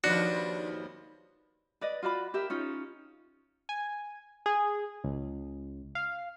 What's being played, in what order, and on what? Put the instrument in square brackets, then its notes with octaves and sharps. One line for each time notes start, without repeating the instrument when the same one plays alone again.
[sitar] D#2 F3 B4 [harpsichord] D4 [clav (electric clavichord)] F#4
[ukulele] B4 D5 D#5
F4 F#4 D5 B5
G4 A#4 E5
C#4 D#4 F4
[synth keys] G#5
G#4
C#2
F5